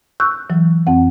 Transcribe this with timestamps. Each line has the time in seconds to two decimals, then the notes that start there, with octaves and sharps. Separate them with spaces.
0.20 C#6 E6 F#6 G6
0.50 E3 F#3
0.87 F2 C4 F#5